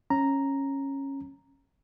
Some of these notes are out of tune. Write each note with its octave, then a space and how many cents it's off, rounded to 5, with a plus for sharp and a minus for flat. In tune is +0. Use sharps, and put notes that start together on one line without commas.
C#4 -15 A#5 +0